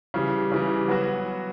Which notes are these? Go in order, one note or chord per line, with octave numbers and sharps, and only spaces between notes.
C#3 E3 G3
C#3 E3 G3
F#3 B3 F#4